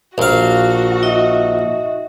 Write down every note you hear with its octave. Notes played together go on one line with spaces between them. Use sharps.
A#1 F#4 F5
D#4 D#5 E5